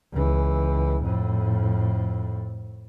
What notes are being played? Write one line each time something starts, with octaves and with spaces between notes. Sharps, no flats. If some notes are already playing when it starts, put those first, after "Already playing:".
C#2 E3
F2 A2